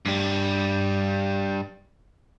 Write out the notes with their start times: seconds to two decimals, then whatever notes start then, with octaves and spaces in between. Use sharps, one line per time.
0.06 G2 G3